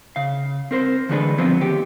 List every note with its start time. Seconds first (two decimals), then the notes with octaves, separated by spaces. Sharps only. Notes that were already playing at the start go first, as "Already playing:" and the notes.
0.16 C#3 F5
0.71 C4 A#4 C5
1.09 D3 E3 G#3 A3 D4 B4
1.38 F3 F#3 G#3 B3 C4
1.61 D#2 G4